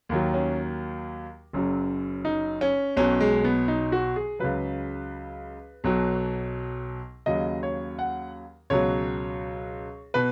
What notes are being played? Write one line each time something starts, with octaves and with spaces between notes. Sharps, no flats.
D#2 D#3 F#3
C#4
F#1 F#2 F#3
D#4
C#4
B1 B2 F#3 C#4
G#3
B3
D#4
F#4
G#4
C#2 C#3 F#3 B4
B1 B2 F#3
D#2 C#3 F#3 D#5
C#5
F#5
C#2 B2 F#3 C#5
B2 B4